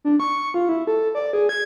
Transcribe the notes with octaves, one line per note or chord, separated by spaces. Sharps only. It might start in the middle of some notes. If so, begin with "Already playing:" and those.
D4
C#6
F4
E4
A4
D5
G#4
G#6